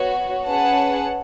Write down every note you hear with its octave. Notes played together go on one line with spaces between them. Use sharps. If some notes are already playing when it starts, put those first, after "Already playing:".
Already playing: B3 F#4 C#5
C#4 G#4 B4 F#5 A5